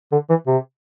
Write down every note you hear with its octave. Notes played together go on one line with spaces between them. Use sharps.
D3
E3
C3